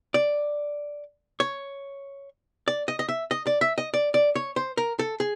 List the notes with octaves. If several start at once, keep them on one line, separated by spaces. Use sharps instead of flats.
D5
C#5
D5
D#5
D#5
E5
D#5
D5
E5
D#5
D5
D5
C#5
C5
A#4
A4
G#4